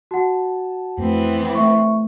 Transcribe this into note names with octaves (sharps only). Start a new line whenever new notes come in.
F#4 F#5 A5
F2 E3 A3 B3 C4
A3 E5 C#6